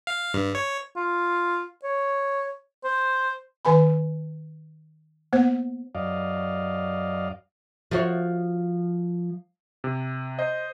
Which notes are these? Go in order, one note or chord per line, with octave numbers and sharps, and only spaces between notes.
F5
G2
C#5
F4
C#5
C5
D#3 B4 G#5 B5
A#3 B3 C5
F#2 D5 D#5 F5
F3 F#4 C#5
C3
C5 D#5